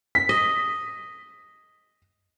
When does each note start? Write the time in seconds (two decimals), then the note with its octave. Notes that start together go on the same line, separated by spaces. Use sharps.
0.15 B6
0.29 D#5